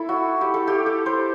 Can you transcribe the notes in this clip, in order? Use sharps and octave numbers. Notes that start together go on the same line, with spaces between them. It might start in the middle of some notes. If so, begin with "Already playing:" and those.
Already playing: E4 A4
F#4
G4
A4
G4
A4
C5